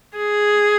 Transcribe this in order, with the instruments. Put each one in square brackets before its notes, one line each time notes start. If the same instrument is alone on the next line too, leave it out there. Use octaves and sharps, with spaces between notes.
[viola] G#4